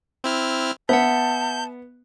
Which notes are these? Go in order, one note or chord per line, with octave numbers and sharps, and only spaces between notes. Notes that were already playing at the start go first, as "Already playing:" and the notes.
C4 E4 F6
B3 E5 F#5 A5 G6